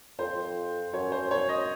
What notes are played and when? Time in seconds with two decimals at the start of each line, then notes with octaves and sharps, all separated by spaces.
0.19 F2 C5
0.35 F2
0.93 F#2 C#5
1.12 C5
1.31 C#5
1.49 D#5